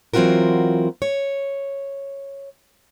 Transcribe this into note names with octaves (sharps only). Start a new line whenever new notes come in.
E3 F#3 C4 F4 F#4 A#4
C#5